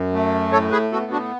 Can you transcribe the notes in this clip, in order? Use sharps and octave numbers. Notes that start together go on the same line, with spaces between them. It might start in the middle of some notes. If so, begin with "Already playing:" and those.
Already playing: F#2
A3
A2 A4 C#5
G#4 B4
B3 F#4 A4
D4 F#4